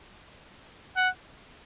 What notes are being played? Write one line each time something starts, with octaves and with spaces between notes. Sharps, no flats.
F#5